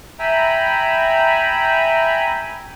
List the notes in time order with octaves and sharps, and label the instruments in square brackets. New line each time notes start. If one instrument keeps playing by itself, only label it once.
[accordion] E5 G5 G#5 A#5 B5